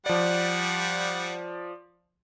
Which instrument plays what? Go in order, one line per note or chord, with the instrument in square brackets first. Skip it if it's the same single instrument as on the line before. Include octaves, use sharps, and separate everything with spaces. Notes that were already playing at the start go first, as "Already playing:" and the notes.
[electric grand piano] F3 D5 [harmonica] G3 F#5